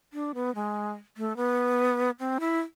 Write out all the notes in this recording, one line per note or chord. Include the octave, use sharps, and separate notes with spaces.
D4
B3
G#3
A3
B3
C4
E4